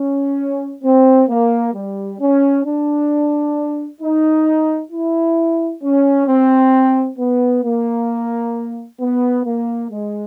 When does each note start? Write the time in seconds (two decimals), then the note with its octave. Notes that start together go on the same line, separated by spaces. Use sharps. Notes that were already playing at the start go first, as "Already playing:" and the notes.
Already playing: C#4
0.83 C4
1.29 A#3
1.74 G3
2.20 C#4
2.66 D4
4.01 D#4
4.92 E4
5.83 C#4
6.27 C4
7.19 B3
7.63 A#3
9.01 B3
9.45 A#3
9.91 G#3